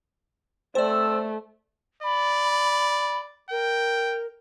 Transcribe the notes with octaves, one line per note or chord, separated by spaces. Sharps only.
A3 C4 C5 D5 A5 E6
D5 B5
A#4 G5